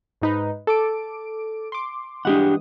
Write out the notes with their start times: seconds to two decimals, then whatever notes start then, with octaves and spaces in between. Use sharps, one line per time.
0.22 G#2 D#4 B4
0.67 A4 D6 D7
1.72 C6 D6
2.25 E3 G#3 D4 G4 F#5 D#6